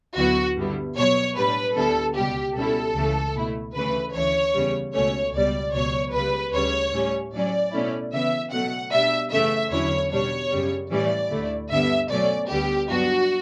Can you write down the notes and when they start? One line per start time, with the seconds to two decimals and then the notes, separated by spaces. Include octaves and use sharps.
0.16 D2 D3 F#3 B3 E4 F#4
0.56 G2 D3 G3 B3 E4
0.96 B2 F#3 B3 C#5
1.36 A2 G3 D4 B4
1.76 D2 D3 G3 B3 E4 A4
2.15 C#2 B2 G3 G4
2.56 B2 G3 C#4 E4 A4
2.95 C#2 C#3 E3 A3
3.35 B2 A3 E4
3.74 D2 C#3 E3 A3 B4
4.14 D2 C#3 E3 C#5
4.54 E2 C#3 G3
4.94 C#2 B2 A3 C#4 C#5
5.34 C#2 B2 G3 D5
5.74 C#2 B2 F#3 C#5
6.13 C#2 C#3 G3 B4
6.53 D2 C#3 G3 C#5
6.93 A2 G3 C#4
7.33 A2 F#3 C#4 D5
7.72 B2 A3 C#4 E4
8.13 C#3 E3 B3 E5
8.52 B2 F#3 A3 F#5
8.93 B2 G3 D4 E5
9.32 F#2 C#3 E3 A3 E5
9.72 E2 D3 F#3 C#4 E4 C#5
10.11 B2 G3 D4 C#5
10.52 F#2 C#3 G3
10.91 A2 E3 G3 C#4 D5
11.31 D2 D3 A3 E4
11.71 G2 D3 G3 B3 E5
12.10 B2 F#3 A3 C#4 D5
12.50 D2 D3 G3 B3 G4
12.90 G2 F#3 B3 D4 F#4